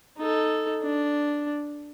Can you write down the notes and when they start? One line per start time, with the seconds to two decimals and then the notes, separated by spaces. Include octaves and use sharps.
0.17 D#4 A4
0.82 D4